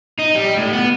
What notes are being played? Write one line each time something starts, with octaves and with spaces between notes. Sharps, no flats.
D#4
G3
A2
B3